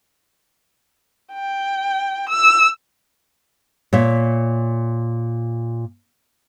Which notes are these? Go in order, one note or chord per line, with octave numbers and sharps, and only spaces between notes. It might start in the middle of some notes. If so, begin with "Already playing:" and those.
G5
E6
A#2 C#5 E5